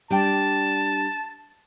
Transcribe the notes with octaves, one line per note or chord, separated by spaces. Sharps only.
G3 D4 G5 A5